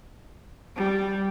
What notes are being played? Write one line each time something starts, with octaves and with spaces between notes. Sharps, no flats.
G3